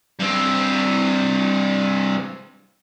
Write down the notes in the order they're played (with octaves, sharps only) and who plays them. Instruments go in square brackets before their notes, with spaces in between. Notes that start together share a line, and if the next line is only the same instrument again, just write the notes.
[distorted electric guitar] G2 C4